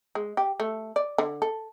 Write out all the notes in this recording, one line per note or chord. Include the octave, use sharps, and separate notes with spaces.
G#3
G4
A3
D5
D3
A4